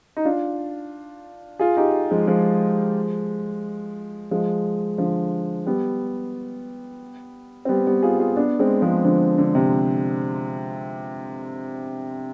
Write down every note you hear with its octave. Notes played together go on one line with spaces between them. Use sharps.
D#4
D4 F4
F4 G#4
D#4 G4
F3 G#3
F3 G#3
F3 G#3
D3 F3
G3 B3
C4
G3 B3
G3 B3
F4 G#4
F4 G#4
B3 D4
G#3 C4
F3 G#3
D3 F3
D3
C3